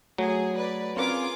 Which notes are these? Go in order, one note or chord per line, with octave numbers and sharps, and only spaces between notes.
F#3 A3 G#4
B4 D5
C4 C#4 F4 G#4 A#4 B4 D6